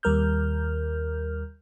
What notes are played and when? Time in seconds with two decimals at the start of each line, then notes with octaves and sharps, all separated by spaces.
0.03 D#2 G3 A#4 F6 G6